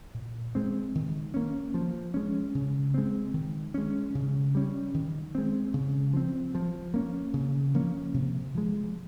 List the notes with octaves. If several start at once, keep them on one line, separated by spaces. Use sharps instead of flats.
A#2
G#3 C4
D#3
A#3 C#4
F3
G#3 C#4
C#3
G#3 C4
D#3
G#3 C#4
C#3
G3 C#4
D#3
G#3 C4
C#3
F3 C4
F3
A#3 C#4
C#3
F3 A#3 C#4
C3
F3 G#3